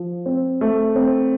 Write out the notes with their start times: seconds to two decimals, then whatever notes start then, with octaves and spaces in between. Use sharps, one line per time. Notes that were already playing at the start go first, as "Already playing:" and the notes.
Already playing: F3
0.26 C4
0.61 A3
0.96 C4